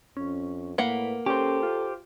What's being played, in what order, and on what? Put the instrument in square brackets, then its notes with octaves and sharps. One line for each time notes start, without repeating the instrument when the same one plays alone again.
[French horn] F2 [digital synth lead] C#4
[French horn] A2 [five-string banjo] A#3 F#5 [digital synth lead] B4
[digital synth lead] C#4 [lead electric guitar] G4 C5 [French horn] A4
[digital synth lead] F4